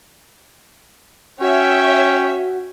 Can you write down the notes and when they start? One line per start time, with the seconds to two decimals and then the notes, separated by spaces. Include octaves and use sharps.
1.41 C#4 F#4 C#5 E5 G5